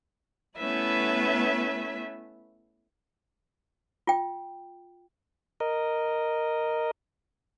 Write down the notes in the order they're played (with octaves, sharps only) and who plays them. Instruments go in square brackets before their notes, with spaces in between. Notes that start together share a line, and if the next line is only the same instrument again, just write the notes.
[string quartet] A3 B3 C#4 E4 B4 E5
[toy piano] F4 G5
[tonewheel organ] A#4 D#5